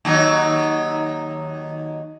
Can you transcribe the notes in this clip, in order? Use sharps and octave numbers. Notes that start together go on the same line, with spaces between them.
D#2 F#3 D#4